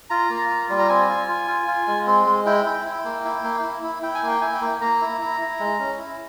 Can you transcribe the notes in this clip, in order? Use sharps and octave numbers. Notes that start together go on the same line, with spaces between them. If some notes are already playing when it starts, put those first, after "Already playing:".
F4 A#5
A#3
F4
G3
A#5
C4 G#5
F4
F4
F4
F4
G#3
C4
G#3
E4 G5
E4
E4
A#3
E4
A#3
E4
E4
E4 G5
G#5
A#3
G5
E4 G#5
G5
A#3
A#3 A#5
E4
E4
E4
G#3
C#4
E4